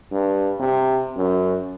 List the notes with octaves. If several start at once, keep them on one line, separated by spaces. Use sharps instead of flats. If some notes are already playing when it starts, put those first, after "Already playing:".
G2
C3
F#2